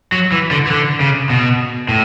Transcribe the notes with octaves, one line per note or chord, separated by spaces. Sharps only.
F#3
E3
D3
E3
D3
C#3
B2
A2